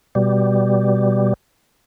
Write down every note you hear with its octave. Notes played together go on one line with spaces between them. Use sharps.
B2 G3